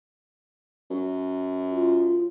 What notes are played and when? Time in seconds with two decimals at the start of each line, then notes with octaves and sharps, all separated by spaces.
0.91 F#2
1.72 F4